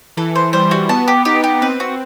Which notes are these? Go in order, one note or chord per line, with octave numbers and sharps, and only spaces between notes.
E3 A4
C5
G3 C5
F#4
B3 A5
G4
D#4 G4
G4
C4 B4
F#4